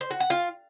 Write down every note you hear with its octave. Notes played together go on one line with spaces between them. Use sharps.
C5
F#4
F#5
F4